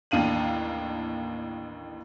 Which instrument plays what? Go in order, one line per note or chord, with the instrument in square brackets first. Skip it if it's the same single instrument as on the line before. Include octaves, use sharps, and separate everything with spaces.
[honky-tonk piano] A1 D#2 D4 F5 D#7 F#7